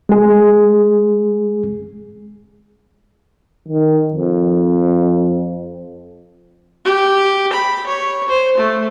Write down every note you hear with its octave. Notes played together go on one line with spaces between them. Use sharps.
G#3 G#4
D#3
F2
G4
B5
C#5
C5
A3